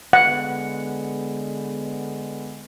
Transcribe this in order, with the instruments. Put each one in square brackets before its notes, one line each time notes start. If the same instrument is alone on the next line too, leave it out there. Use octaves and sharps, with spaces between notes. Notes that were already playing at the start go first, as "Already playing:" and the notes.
[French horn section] D3 G#3 B3 [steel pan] F#5